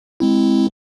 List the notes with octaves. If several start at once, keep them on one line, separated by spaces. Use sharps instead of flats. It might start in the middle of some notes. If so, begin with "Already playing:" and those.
G#3 C4 E4